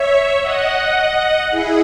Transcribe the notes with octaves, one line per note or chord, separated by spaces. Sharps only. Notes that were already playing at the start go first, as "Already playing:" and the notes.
Already playing: C#5 E5
D#5 F#5
E4 G#4